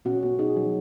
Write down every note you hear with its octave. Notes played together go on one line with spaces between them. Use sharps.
B2 C#4 F#4
B2
B2 D#4 G#4
F#3